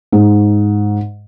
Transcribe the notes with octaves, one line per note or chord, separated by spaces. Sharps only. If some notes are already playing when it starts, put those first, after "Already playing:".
G#2